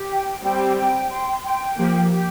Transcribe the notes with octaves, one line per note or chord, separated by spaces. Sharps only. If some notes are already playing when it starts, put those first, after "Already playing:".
Already playing: G4
G5
G3 C4 G5
G5
C6
G5
F3 A#3 G4
G4